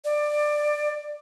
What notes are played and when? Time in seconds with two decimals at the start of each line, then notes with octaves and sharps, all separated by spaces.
0.05 D5